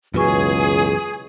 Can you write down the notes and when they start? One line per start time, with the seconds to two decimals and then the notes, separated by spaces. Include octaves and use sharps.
0.14 C#2 F#2 B2 E3 F#4 G#4 B4 C#6